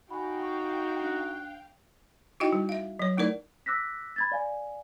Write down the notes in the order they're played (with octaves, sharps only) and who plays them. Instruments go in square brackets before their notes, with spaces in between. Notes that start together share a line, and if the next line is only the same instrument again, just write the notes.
[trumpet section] D#4 F#4 [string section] F5 G5 [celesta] G#5 B5
[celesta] C#6
D4 F#6
[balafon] D#4 E4 F#4 D#5 G5
G3
E5 F5
F#3 C#5
A3 D#4 E4 A#4 D5
[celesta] D6 E6 F#6 A#6 B6
B5 G#6 A6
D5 F5 G#5